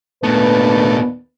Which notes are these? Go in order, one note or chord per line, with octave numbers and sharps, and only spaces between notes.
D#2 A#2 A3 B3 D4 B4